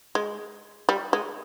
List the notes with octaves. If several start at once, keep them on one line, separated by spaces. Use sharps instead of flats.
G#3
G3
G#3